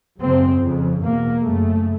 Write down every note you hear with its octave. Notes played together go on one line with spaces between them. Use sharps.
F#2 C#3 C4
F2 C#3
E2 B2 A#3
F#2 C#3 A3